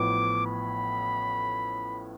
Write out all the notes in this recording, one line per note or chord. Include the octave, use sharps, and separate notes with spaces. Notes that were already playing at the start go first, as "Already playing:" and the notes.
Already playing: A1 A2 F3 B3 D6
B5